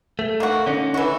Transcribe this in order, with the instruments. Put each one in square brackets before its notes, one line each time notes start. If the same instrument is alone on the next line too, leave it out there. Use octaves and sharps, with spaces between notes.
[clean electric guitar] A3
[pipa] A#3 F#4
[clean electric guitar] D3 C#4 D#4
[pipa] E3 F#4